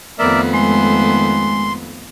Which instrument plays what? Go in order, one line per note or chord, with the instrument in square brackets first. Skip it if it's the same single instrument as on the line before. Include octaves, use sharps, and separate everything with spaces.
[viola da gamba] F2 B3 [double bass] D#3 A3 [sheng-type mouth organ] A#4 D5 E5
[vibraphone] G#3 [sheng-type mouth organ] C6